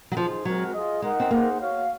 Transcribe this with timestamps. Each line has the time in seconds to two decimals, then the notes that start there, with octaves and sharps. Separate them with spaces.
0.12 F#3
0.15 F3 D#4 G#4 C5
0.45 F#3 G#3 C4 F#4 A#4
0.73 F4 G#4 D#5
1.02 G#3 D#4 A#4 D#5 F#5
1.20 C4
1.30 A#3 D#4 G#4 C5 F#5
1.59 F#4 C#5 F5